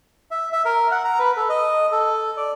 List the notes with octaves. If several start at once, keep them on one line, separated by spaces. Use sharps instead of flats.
E5
E5
A#4
F#5
A#5
B4
A4
D#5
A4
D5